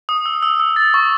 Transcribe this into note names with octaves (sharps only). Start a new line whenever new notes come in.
D#6
E6
E6
E6
A6
C#6